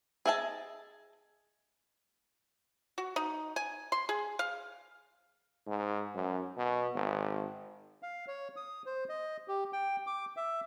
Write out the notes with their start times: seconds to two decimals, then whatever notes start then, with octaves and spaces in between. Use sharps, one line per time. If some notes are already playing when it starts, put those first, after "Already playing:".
0.26 G#4 D#5 E5 F#5 A5
2.98 F#4
3.16 D#4
3.56 G#5
3.92 C6
4.09 G#4
4.39 F5
5.67 G#2
6.15 F#2
6.57 B2
6.95 G#1
8.03 F5
8.27 C#5
8.56 D#6
8.86 C5
9.09 D#5
9.48 G4
9.73 G5
10.07 D6
10.36 E5